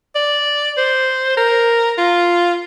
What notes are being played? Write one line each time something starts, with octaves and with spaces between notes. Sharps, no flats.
D5
C5
A#4
F4